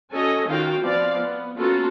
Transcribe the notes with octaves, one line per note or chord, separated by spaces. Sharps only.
C#4 F#4 A4 C#5 D#5 G#5
D#3 C#4 F4 F#4 F5 G5
F3 B3 C4 D5 F5
B3
A#3 B3 C#4 F4 F#4 A4